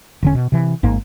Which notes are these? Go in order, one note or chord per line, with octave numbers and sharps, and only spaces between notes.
E1 D3 C#4
B2
C3 E3
G#1 G#2 A#3